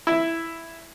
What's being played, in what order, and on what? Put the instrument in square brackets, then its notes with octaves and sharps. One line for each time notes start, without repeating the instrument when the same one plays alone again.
[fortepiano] E4